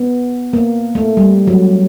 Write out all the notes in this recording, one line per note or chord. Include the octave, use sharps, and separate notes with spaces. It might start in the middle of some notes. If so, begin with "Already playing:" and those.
Already playing: B3
A#3
A3
G3
F#3